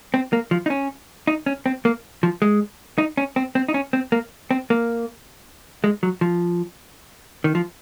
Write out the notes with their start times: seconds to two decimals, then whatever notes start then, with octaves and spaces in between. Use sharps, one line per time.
0.14 C4
0.33 A#3
0.51 F3
0.66 D#4
0.70 C#4
1.27 D#4
1.46 C#4
1.66 C4
1.85 A#3
2.23 F3
2.42 G#3
2.98 D#4
3.17 C#4
3.36 C4
3.55 C4
3.68 D#4
3.74 C#4
3.93 C4
4.12 A#3
4.51 C4
4.70 A#3
5.84 G#3
6.03 F#3
6.21 F3
7.44 D#3
7.55 F3